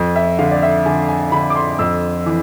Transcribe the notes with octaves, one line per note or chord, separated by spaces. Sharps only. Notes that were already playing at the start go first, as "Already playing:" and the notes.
Already playing: F2
E5
D3 F5
D5
E5
D3 G#5
G#5
D3 B5
D6
C6
F2 E6
E3